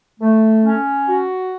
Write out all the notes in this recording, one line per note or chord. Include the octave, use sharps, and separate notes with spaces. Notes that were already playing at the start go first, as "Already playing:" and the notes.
A3
C#4
F#4